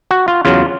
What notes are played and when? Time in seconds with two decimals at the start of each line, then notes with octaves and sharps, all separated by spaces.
0.11 F#4
0.28 F4
0.45 E2 C#3 F#3 F4